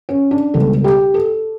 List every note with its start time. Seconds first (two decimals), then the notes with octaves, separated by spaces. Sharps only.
0.09 C#4
0.31 D4
0.54 C#2 B2 G3 A4
0.74 A4
0.84 G4
1.14 A4